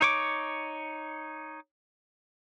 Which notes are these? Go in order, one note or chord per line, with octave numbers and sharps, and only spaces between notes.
D#4 C#5 D6